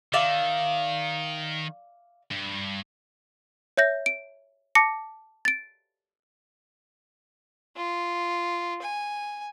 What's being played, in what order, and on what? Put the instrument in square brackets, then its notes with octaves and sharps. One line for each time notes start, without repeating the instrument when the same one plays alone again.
[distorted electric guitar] D#3 [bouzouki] D5 E5 F5
[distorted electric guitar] G2
[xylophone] C#5 E5 G6 A#6
D7
A5 D6 A#6 C#7
A6 D7
[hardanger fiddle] F4
G#5